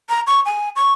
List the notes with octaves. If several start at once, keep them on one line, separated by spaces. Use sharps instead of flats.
A#5
C#6
G#5
C#6